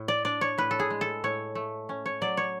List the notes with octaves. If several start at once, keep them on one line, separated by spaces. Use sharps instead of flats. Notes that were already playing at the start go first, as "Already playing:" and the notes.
Already playing: A2
D5
D4 D5
C#5
A2 B4
A4
G#4
G#3
A4
A2 C#5
A3
C#4
C#5
F#3 D5
C#5